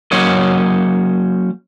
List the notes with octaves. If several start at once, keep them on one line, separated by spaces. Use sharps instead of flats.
F#3 A#3 C#4 C5 C#5 D#5